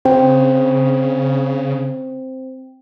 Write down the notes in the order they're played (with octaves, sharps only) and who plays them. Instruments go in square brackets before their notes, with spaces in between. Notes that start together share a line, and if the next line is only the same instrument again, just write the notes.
[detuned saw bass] C#3 [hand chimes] C4 C5 G5